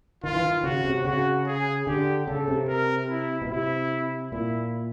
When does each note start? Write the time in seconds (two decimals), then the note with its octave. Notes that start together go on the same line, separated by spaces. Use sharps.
0.24 D#3 F4
0.34 E3
0.43 D#3
0.63 C#3 F#4
0.85 C3
1.05 C#3 F#4
1.46 G#4
1.87 D3 G4
2.27 C#3 A4
2.48 C3
2.68 A#4
3.09 E4
3.42 B2
3.50 C3 E4
4.31 A#2 E4